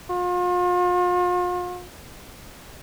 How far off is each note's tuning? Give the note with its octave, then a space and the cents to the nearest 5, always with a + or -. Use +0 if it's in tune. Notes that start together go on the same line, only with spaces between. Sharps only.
F4 +40